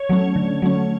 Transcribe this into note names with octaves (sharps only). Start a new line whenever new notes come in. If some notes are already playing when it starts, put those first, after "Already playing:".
Already playing: C#5
F#3 A3 C#4
D3
F#3 A3 C#4